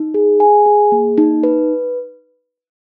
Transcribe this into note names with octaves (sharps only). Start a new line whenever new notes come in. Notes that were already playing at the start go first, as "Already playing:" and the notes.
Already playing: D#4
G#4
G#5
G#4
A#3
D#4
B4